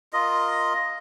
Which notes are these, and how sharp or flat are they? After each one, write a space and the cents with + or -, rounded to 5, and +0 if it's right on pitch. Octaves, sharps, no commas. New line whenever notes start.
F4 +0 A#4 +0 D#5 +0